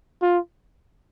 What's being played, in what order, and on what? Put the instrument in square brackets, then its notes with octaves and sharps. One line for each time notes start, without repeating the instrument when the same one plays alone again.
[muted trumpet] F4